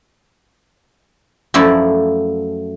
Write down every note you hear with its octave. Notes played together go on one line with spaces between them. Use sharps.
F#2 F3 A3 E4 D5